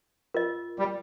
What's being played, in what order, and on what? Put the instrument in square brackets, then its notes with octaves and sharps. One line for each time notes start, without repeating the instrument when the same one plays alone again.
[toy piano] F4 A#4 D#5
[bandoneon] G3